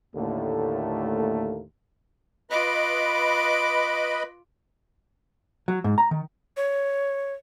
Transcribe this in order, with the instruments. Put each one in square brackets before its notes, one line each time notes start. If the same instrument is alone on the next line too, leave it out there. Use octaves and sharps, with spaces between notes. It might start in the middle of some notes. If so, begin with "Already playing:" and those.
[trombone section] D#2 A2 D3 A3 A#3
[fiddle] F4 D6 [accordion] B4 D#5 B5
[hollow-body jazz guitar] F#3
G#2
A#5
D#3
[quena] C#5